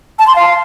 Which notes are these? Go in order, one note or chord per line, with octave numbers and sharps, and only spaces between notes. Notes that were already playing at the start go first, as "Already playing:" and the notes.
A5
C6
F5